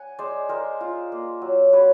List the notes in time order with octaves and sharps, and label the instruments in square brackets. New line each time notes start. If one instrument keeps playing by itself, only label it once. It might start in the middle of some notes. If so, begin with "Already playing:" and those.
Already playing: [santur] F#5 G#5
G#3 C5 D5
G#3 A#4 C5
F4
A#3
F#3
F#3 B4 C#5